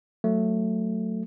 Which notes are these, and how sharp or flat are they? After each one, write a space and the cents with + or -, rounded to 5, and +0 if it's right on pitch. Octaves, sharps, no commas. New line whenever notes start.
F#3 +0 A3 +10